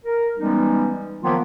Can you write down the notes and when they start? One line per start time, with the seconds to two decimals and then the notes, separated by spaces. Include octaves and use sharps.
0.04 A#4
0.38 E3 G3 G#3 B3 C#4 D#4
1.23 D#3 F3 F#3 A#3 B3 F4